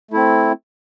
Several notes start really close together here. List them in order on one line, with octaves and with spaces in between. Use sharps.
A3 E4 C4